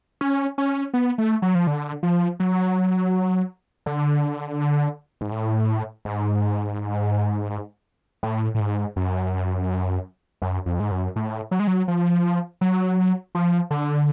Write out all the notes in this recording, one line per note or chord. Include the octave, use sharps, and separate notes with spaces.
C#4
C#4
B3
A3
F#3
F3
D3
F3
F#3
D3
G#2
A2
G#2
A2
A2
G#2
F#2
F#2
F2
G#2
F#2
A2
F#3
G#3
F#3
F3
F#3
F3
D3